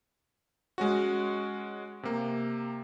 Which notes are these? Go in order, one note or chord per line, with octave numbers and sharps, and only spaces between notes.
G#3 C#4 F#4
C3 A#3